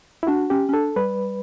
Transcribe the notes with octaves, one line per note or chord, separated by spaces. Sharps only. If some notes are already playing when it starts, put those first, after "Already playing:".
E4
D4 F#4
C#4 G4
C#4
D4 A4
G3 B4